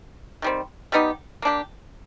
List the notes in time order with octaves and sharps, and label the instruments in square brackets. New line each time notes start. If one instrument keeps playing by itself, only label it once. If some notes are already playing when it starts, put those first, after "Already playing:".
[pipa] D#3 G3 C4
G3 B3 D#4 G4
A#3 D4 G4